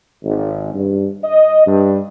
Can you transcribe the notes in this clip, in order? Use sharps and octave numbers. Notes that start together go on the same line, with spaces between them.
G#1
G2
D#5
G2